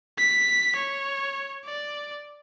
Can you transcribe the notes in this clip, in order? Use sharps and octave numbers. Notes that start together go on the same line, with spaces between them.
B6
C#5
D5